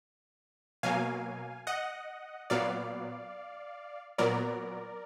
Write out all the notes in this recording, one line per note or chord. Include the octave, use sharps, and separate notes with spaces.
B2 F#3 A#3 F5 G#5
D#5 F#5
A#2 F#3 B3 D5 F5
A#2 F#3 B3 A#4 D5